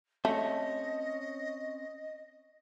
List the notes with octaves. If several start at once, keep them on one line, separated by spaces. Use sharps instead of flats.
A3 C4 C#4 C#5 D#5